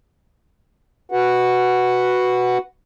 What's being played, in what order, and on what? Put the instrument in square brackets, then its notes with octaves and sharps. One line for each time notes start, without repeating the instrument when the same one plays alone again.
[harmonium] F#4 B4 F#5